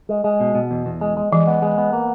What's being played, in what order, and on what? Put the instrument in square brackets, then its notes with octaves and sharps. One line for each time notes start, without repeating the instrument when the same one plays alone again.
[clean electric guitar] G#3
G#3
B2
B2
E2
E2
G#3
G#3
[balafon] E3 [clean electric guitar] G#3
[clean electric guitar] B3
G#3
B3
A#3